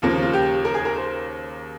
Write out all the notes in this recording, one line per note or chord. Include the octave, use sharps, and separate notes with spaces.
D#2 C#3 F3 A#3 F4
F4
G4
A#4
G#4
A#4
C5